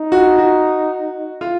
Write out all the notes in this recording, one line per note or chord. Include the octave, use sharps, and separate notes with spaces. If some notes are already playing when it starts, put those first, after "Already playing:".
Already playing: D#4
F#4
F#4
F4